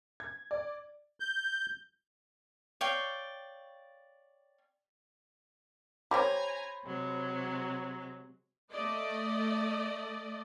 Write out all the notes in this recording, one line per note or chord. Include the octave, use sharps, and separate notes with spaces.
G#6
D5
G6
C#5 D5 F5 G5
G4 A#4 C5 C#5 G5 G#5 A#5 B5
C3 F#3 G#3
A3 D5 D#5